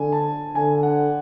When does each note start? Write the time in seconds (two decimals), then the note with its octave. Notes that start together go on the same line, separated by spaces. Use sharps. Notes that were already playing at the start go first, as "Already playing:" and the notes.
Already playing: D3 G#5
0.13 A5
0.55 D3 G#5
0.83 F#5